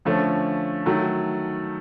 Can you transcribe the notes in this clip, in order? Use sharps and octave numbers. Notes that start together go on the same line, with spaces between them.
D3 F3 A3 C#4
D#3 F#3 A3